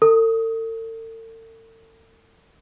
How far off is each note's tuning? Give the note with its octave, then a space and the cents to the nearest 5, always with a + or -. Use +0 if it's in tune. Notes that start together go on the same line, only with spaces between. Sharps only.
A4 +45 D#6 +20